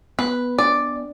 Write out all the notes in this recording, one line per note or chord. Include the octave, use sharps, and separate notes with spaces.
B3 B4
D4 D5